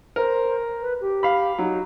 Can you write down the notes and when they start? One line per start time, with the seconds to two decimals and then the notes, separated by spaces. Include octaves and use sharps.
0.16 A#4 C5
0.81 B4
1.01 G4
1.23 F5 B5
1.58 F#3 D#4